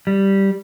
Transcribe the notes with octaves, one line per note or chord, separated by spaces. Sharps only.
G3